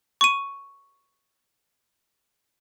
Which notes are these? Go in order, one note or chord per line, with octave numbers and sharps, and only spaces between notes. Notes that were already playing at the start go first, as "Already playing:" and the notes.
C#6 D#7